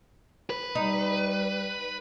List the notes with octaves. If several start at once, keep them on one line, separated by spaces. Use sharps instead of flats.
B4
G3 D#4